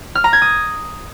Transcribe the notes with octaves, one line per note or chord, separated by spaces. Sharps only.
F6
A#5
G#6
D#6